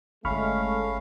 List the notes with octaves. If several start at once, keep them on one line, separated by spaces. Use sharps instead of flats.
G1 G#3 A3 C#4 F5 B5 C#6 F6